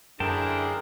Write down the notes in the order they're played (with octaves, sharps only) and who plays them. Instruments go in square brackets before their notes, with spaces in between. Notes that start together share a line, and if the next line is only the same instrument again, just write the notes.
[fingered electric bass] F#2 [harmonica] D3 E4 [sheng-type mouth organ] G#4 A#4 [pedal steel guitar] C5 G5 A5